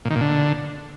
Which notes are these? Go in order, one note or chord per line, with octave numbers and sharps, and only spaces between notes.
A#2
D#3
A#2
D3